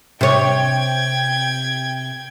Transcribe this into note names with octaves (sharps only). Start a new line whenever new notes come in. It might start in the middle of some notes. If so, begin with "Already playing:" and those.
C3 C#5 G5 G#6